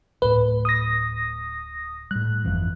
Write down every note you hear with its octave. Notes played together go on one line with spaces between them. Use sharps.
D1 A2 B4
D#6 A#6
A2 G3 F#6
G1 F2 E3